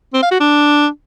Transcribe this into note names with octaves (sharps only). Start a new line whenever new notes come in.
C4
F5
F#4
D4